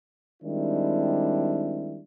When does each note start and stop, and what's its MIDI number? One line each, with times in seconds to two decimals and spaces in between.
0.42 2.00 51
0.42 2.00 55
0.42 2.00 56
0.42 2.00 60
0.42 2.00 62
0.42 2.00 64